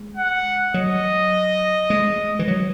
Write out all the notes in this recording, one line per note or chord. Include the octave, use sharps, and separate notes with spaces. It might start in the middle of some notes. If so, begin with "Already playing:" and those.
Already playing: G#3
F#5
F#3 D#5
G#3
E3
F#3